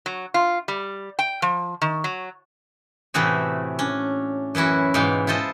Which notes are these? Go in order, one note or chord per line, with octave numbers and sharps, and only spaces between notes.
F#3
F4
G3
G5
F3
D#3
F#3
A2 C3 E3 A3 F#4 G#4
C#4 D4
F#2 E3 C#4 E4 F#4
G#2 B2 E3 F5 G5
E4 F4 A4 C5 D#5